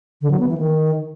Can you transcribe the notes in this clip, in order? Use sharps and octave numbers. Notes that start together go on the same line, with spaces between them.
D3
F#3
B3
E3
D#3